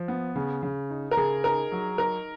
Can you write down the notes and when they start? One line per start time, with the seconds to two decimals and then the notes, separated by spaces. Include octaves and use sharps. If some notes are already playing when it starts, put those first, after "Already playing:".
Already playing: F3
0.08 B3
0.36 C#3
0.63 C#3
0.90 D#4
1.11 A#4
1.17 C#3 G#4
1.44 D#4 A#4
1.72 F#3
1.98 D#4 A#4